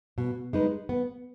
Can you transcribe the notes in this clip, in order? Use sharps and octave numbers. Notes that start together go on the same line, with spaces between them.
B2
G#3 D#4 B4
B3